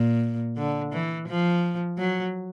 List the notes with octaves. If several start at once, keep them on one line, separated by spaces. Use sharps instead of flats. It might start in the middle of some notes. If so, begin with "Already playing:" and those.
Already playing: A#2
D3
E3
F3
F#3